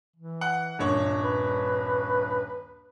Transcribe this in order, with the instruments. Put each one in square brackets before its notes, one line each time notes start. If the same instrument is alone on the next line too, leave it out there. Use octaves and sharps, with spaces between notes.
[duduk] E3
[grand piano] F#5
D#1 G2 C#5
[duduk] B4